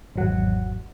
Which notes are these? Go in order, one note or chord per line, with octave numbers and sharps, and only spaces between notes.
G#1 E2 F#3 F#5